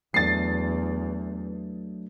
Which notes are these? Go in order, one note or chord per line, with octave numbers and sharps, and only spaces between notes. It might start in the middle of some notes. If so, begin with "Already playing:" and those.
E2 F#3 A3 D4 A6 C7